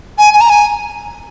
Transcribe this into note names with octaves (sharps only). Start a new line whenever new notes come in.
G#5
G#5
A#5
G#5